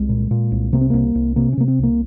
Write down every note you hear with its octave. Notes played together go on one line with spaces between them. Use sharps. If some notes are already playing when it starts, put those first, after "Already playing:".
Already playing: C2 G#3
A#2
A#2
C2
C3 A#3
C4
C2 A#3
C2
C3 A#3
C#4
C3 A#3
C4
C2 A#3